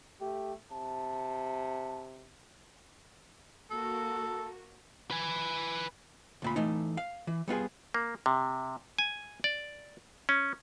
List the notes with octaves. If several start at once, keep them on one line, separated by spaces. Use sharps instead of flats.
A3 G4
C3 A5
A#3 F#4 A4 A#4
B4 G#5
D2 A#2 B5
E3 A3 D#4
F5
E3
G3 B3 F4 G#4
A#3
C3
G#5
D5
C#4